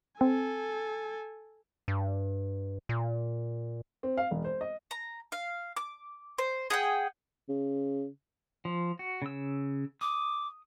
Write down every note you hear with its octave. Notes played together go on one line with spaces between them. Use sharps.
C4 A4 G#5
G2
A#2
C4
F5
E1
C5
D#5
A#5
F5
D6
C5
G#4 F#5 G5
C#3
F3
F#4
C#3 E6
D6 D#6